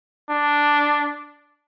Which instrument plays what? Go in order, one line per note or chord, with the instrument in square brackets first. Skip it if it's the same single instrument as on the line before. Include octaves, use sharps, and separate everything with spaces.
[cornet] D4